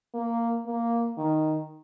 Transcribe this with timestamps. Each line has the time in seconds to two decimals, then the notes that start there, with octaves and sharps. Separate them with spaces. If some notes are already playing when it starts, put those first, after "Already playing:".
0.14 A#3
0.66 A#3
1.18 D#3